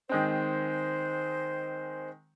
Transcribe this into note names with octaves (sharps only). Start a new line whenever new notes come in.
D#3 G#3 C4 C5